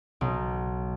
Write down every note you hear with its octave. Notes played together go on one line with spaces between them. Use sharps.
B1